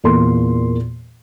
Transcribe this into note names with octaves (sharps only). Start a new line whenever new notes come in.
E2 A#2 A#3 C6